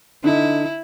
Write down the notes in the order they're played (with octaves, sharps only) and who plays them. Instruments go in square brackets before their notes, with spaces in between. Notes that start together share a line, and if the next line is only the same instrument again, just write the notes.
[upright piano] D3 D#4 [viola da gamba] E4